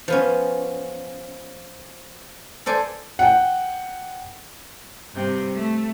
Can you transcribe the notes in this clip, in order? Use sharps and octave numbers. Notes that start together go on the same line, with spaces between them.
F3 B3 C#4
A4 C5 D5 G#5
F#5 G5
G2 C3
A3